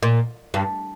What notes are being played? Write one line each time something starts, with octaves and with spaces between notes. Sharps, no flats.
A#2
G2